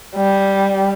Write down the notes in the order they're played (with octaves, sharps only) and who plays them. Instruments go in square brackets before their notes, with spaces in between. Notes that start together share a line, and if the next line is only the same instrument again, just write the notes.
[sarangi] G3